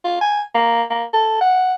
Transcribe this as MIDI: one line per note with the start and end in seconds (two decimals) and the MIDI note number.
0.04 0.20 65
0.21 0.42 80
0.54 0.82 58
0.90 1.04 58
1.13 1.36 69
1.41 1.74 78